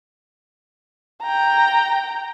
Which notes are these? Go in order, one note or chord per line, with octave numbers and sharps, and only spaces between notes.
G5 A#5